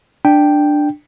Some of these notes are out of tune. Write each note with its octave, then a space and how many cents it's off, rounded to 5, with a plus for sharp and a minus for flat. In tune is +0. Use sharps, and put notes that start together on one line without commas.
D4 +10 G5 +0